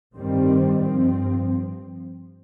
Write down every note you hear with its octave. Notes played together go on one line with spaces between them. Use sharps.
G2 D#3 G3 C4
G2 F3 C4